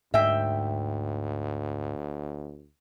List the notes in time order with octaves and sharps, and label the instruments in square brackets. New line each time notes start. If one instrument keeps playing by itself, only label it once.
[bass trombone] D2 [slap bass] G#2 [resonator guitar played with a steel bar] E5 G5